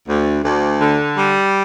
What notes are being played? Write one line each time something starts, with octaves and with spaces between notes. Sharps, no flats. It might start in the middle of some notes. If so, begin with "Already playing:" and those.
D2
D2
D3
G3